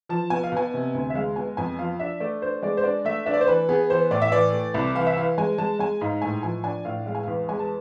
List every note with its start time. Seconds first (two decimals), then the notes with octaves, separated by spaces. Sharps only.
0.09 F3 A5
0.30 B2 G#5
0.43 F5
0.52 B2 G#5
0.74 C3
0.94 D2
1.10 E5
1.15 G#3 F5
1.36 B2 G#5
1.57 F2 G#5
1.79 F3 F5
1.99 D4 E5
2.20 A3 D5
2.42 D4 C5
2.63 G#3 D5
2.77 C5
2.84 D4 D5
3.05 A3 E5
3.26 D4 E5
3.34 D5
3.41 C5
3.47 E3 B4
3.69 B3 G#4
3.90 E3 C5
4.11 A2 D5
4.22 E5
4.32 E3 D5
4.53 A3
4.74 C2
4.95 E3 F5
5.06 E5
5.16 E3 F5
5.38 G#3 G#5
5.58 G#3 A5
5.79 G#3 G#5
6.01 G#2 F5
6.22 A2 G#5
6.43 F3 G#5
6.64 D4 G#5
6.85 A2 F5
7.06 G#3 F5
7.15 G#5
7.23 E2 F5
7.49 G#3 G#5
7.59 A5